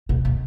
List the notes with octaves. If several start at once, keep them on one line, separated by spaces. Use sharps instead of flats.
B2
B2